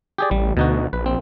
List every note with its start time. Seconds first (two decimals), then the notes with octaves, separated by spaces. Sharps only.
0.18 G4 G#4 D5
0.31 A1 G3
0.57 D2 B2 D#4 F#4
0.93 A#1 B4
1.06 C4